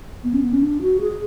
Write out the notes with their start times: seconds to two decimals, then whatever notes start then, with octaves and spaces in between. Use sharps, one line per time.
0.24 B3
0.34 C#4
0.43 B3
0.53 C#4
0.62 D4
0.82 F#4
1.01 G#4